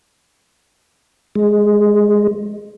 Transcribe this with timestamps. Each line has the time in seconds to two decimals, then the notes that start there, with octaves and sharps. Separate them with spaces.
1.35 G#3